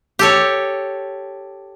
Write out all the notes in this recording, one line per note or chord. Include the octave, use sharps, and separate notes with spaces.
G4 A4 C#5